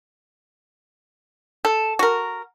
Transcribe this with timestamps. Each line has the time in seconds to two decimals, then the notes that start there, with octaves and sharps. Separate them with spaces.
1.65 A4
1.99 F#4 A#4